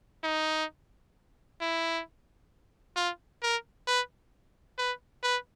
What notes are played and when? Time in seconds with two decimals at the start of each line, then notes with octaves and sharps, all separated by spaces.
0.24 D#4
1.61 E4
2.96 F4
3.43 A#4
3.87 B4
4.78 B4
5.23 B4